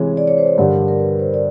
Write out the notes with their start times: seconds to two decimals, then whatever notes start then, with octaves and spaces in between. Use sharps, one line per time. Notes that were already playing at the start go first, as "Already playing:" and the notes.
Already playing: C3 E3 G#3 C#5
0.17 D5
0.28 C#5
0.38 C5
0.48 D5
0.58 G2 D3 G3 A#4
0.88 A#4
0.99 B4
1.19 C5
1.34 D5